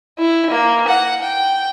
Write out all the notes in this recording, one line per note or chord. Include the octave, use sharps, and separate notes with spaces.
E4
A#3
F#5
G5